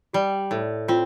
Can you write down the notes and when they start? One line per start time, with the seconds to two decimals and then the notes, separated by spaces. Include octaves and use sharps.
0.13 G3 G4
0.51 A2
0.88 C4 F4